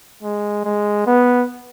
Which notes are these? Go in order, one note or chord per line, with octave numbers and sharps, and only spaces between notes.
G#3
G#3
B3